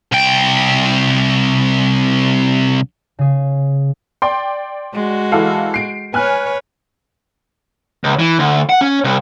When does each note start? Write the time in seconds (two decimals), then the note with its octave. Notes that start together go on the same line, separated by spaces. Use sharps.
0.12 C2 G5
3.19 C#3 G#4
4.22 D5 G5 C6
4.94 G#3 F#4
5.32 E3 A4 F5
5.74 C7 D7
6.14 B4 C#5 G#5 F6 F#6
8.04 C#2
8.19 E3
8.39 D2
8.69 F#5
8.81 C#4
9.04 C2